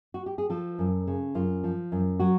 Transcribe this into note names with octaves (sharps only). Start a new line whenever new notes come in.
F#4
G4
G#4
F3 A4
F#2
C#3
F#2 F4
F3
F#2
F#3 F#4